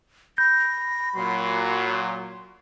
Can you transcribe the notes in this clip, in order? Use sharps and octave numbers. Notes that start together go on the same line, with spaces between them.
B5 G6 A#6
A#2 F#3 C6